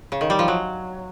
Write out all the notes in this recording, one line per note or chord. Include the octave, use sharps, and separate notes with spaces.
C#3
D#3
G3
F3
F#3